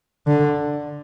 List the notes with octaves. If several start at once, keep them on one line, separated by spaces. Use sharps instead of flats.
D3